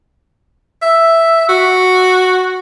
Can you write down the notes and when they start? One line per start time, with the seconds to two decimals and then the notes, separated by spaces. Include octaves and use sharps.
0.82 E5
1.49 F#4